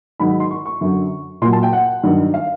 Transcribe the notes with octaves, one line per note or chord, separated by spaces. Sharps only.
G#2 D#3 F#3 B5
C6
C#6
C#6
F#2 D3 F#3
A#2 F#3 C6
A5
G5
F#5
G2 D#3 F#3
F5